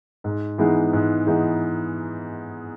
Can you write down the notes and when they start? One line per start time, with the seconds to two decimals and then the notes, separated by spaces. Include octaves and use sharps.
0.24 G#2
0.58 E3 G#3 B3 D#4
0.93 G#2
1.27 E3 G#3 B3 D#4